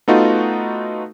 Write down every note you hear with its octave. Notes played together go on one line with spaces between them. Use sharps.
A3 B3 D#4 F4 F#4